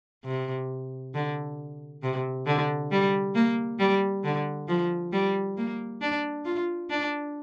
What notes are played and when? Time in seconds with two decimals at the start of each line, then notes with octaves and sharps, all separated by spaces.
0.25 C3
1.15 D3
2.03 C3
2.46 D3
2.92 G3
3.35 A#3
3.79 G3
4.24 D3
4.68 F3
5.13 G3
5.58 A#3
6.02 D4
6.45 F4
6.90 D4